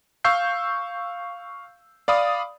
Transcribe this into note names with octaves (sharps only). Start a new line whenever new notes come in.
F5 C#6 E6 G6 C7
D5 F5 B5 D#6